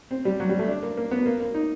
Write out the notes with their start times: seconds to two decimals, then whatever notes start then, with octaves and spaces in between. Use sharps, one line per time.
0.11 C4
0.25 G3
0.40 F#3
0.49 G3
0.59 A3
0.68 D4
0.83 A#3
0.97 A#3
1.11 B3
1.26 A#3
1.40 A#3
1.54 D#4